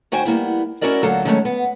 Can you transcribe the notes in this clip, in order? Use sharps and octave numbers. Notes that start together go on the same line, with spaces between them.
D#3 F#4 C5 G5 G#5
G3 A#3 B3 E4
C#4 E4 F#4 A#4 D5 D#5
D2 A#2 F#3 A4 F5 A#5
D3 D#3 F#3 G#3 A3 C#4
B3